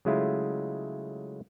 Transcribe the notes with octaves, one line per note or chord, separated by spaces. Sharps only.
C#3 F#3 G#3 A3 E4 F4